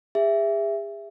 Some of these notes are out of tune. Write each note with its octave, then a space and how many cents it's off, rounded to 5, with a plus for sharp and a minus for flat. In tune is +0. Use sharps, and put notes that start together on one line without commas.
G#4 -40 E5 +10